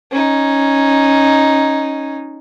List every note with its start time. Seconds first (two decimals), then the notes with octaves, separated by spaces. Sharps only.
0.12 C#4 D#4